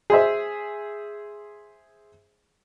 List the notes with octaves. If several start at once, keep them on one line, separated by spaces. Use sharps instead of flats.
G#4 C5 E5